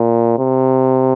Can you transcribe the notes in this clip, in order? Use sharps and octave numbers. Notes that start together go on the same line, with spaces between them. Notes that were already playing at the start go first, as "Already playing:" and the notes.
Already playing: A#2
C3